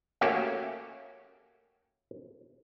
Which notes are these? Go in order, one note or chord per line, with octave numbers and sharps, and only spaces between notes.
A3 A#3 C#4 F#4 G4